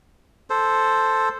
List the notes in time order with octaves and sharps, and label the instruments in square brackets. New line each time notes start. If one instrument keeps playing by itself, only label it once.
[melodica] A4 C5